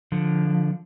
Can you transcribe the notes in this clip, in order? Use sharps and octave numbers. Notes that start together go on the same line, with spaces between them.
D3 F3